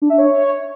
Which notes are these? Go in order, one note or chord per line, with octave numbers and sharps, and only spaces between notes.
D4
E5
C#5